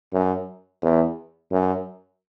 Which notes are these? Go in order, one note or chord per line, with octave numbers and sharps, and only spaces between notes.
F#2
E2
F#2